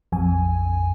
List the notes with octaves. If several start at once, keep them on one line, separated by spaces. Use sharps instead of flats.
A#1 F2 G#5